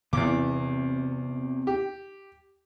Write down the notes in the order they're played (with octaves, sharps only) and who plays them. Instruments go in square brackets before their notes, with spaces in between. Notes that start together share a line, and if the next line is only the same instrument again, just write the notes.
[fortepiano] E2 D6 [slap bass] C3 B3 C4
[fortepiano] G4